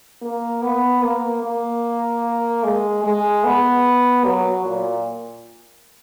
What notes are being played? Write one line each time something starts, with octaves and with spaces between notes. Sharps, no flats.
A#3
B3
A#3
A#3
G#3
G#3
B3
F#3
A#2